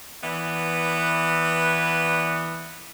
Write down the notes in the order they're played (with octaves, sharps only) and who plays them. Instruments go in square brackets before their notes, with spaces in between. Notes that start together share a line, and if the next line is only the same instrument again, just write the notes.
[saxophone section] E3 B3 D5